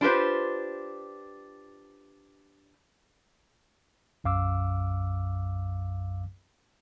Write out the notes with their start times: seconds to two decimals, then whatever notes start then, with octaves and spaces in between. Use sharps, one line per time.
0.01 D4 F4 G4 B4 C5
4.24 B1 F#2 F5 D6 E6